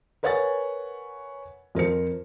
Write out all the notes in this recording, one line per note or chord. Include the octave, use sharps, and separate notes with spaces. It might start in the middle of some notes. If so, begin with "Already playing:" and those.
A#4 B4 C#5 F#5 G#5 A6
F2 A#4 C5 C#7